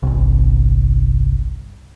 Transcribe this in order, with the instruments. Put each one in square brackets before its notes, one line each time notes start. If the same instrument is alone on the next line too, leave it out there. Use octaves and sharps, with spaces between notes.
[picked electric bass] G1 C2